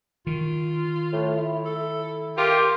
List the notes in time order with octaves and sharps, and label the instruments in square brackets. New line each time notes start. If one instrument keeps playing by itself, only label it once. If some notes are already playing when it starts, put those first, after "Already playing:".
[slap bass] D#3 [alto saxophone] F4
[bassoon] A2
E4
[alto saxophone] A4
[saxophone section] F4 G4 [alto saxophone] A#4